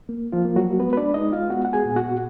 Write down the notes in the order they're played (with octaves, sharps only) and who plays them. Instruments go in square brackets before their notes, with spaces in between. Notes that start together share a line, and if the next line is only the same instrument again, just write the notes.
[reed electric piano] A#3
F3 F4
A#3
F#3 F#4
G#3 B3 B4
B4
D4 D5
G#3 D#4 D#5
F4 F5
B3 F#4 F#5
F#5
G#4 G#5
A#2
F#4 F#5